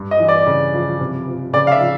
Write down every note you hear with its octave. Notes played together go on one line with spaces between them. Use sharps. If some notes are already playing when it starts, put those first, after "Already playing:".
Already playing: G2
D#5
E3
D5
C#3
F3
C3
F3
C#3 D5
F5
E5
F3